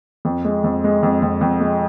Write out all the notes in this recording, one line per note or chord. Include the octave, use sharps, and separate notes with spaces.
F2
G#3
F2
G#3
F2
F2
F2
G#3